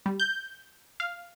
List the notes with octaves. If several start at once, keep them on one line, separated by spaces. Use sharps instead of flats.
G3
G6
F5